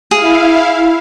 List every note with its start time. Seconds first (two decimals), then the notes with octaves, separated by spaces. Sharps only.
0.11 E4 G#4 F5